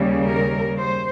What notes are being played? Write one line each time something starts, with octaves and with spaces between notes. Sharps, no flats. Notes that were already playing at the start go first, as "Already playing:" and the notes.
Already playing: D#2 C#3 G3
A#4
C5